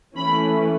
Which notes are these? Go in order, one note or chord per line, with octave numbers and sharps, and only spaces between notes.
E3 A3 C#4 B5